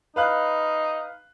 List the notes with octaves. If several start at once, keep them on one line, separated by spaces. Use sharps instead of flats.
D#4 B4 F5 F#6